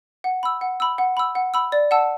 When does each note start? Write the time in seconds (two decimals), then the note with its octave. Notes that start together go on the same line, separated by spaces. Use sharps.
0.24 F#5
0.43 B5 E6
0.61 F#5
0.80 B5 E6
0.98 F#5
1.17 B5 E6
1.35 F#5
1.54 B5 E6
1.72 D5
1.91 F#5 A5 E6